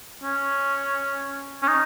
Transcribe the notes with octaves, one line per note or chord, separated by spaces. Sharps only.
C#4
C#4
D#4